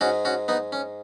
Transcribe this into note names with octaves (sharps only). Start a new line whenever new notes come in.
G#2 G#3 C#4 F#4
C#4 F#4
B3 D#4
C#4